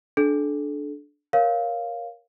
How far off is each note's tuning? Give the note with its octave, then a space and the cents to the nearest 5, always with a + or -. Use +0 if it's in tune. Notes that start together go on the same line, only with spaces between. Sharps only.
D4 +0 A4 -35
A#4 +15 C#5 +0 F5 +0